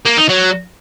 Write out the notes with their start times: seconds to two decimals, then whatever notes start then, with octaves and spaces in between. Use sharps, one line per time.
0.05 A#3
0.17 D#4
0.29 F#3